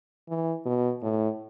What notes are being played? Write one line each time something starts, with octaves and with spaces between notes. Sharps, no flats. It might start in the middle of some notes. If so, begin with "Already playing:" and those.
E3
B2
A2